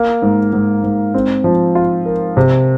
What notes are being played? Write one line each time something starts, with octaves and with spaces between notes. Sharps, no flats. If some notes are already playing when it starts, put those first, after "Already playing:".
Already playing: A#3
G#2
G#2
G#2
C4
F3
F4
A#4
C3